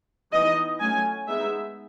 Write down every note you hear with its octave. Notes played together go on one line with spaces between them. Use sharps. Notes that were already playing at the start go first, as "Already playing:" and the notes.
E3 B3 D#4 D#5
F#3 A3 C#4 G#5
G#3 B3 D#4 E5